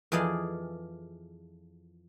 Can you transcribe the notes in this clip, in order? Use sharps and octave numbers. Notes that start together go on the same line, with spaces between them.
F2 E3 G#4 D5 D#5 F5